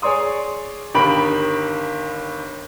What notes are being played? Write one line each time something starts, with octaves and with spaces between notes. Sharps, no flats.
G#4 C#5 D5 C6 D#6
G1 D#3 G4 B5 D7 F#7